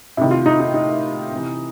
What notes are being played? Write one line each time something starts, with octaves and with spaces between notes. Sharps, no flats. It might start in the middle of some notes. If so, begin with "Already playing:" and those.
C3 D#3 E4
F4
D#4
D#4
D#4
C3 E3